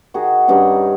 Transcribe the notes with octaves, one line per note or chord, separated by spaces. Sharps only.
D#3 F#4 G#4
G2 C#4 D#4